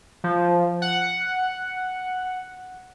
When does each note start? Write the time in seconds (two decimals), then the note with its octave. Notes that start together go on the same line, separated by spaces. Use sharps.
0.24 F3
0.82 F#5